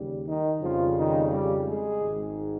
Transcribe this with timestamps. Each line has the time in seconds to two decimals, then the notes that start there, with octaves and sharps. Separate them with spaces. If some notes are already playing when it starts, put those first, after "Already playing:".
Already playing: D#2 C#3 G3
0.26 D#3 D#4
0.61 F2 C#3 F3 G3 F4
0.97 D#3 D#4
1.31 G3 G4
1.66 G#3 G#4
2.01 G#1 G#2 D#3